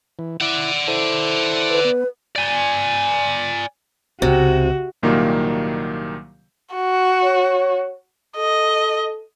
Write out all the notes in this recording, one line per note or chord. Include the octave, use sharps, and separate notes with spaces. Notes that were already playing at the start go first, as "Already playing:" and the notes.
E3
E4 D5 F#5
E4 A4 C5
B4
B3
D5 G#5
C#2 C3 F#4
C2 A#2 D#3 F#3 G3 A#3
F#4
C#5
A4 D#5